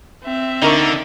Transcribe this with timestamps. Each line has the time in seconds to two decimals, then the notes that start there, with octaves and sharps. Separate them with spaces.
0.23 C4 E5
0.62 D2 D3 D#4 A#4 C#6